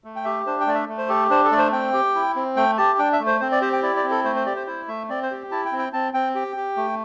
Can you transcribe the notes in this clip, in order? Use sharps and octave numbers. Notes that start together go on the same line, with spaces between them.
A3
G5
G4 E5
D4 C5
G5
A3 D5
E5
A3
C5
G4 A4
D4 C5
A4
A3 D5
C5
C4 G5
G4
E4
C4
A3 G5
G4 A5
D4 G5
E5
A3
C5
C4 C5
D5
G4 C5
G5
E4 D5
D5
C4
A4
A3 C5
C5
G4 D5
C5
E4 C5
A3 E5
C4 D5
C5
G4
E4 A5
G5
C4
G5
C4 A5
C4 G5
G4 G5
G4
A3